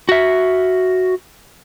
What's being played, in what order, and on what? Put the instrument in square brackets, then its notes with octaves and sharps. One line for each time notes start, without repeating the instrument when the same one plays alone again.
[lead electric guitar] F#4 E5